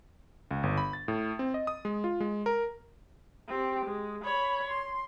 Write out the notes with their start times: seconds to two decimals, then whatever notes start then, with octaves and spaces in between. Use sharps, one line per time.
0.51 C#2
0.63 G1
0.77 B5
0.93 A6
1.08 A2
1.39 C4
1.54 D#5
1.67 D#6
1.85 G#3
2.04 F4
2.20 G#3
2.46 A#4
3.48 C4 G4
3.86 G#3
4.25 C#5 B5
4.70 C6